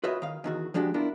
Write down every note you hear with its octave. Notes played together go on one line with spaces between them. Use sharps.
F4 F#4 B4 C#5 D#5 E5
D#3 F5
E2 D#3 F#4
F3 G#3 D4 F#4 G4
B3 D4 E4 F4 A#4